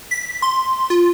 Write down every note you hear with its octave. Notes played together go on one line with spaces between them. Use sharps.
B6
C6
F4